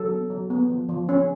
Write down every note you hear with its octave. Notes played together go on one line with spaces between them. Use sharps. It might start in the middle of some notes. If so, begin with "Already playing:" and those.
Already playing: F#3 A4
B3
F#3
B3
F3
F3
C#4